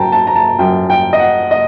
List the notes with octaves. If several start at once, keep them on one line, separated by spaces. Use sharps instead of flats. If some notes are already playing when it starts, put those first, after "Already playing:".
Already playing: F#2 F#3 G5 A5 A#5
A5
A#5
A5
F#2 F#3 G5
G5
D#5
F#5
D#5